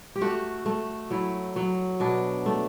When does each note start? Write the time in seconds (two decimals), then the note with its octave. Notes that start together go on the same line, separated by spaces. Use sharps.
0.16 G4
0.21 A3 F#4
0.66 A3
1.10 F#3 E4
1.56 F#3
2.00 B2 D4
2.46 A3